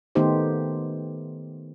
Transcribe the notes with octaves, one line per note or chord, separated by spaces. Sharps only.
D#3 A3 B3 D#4 G4 C5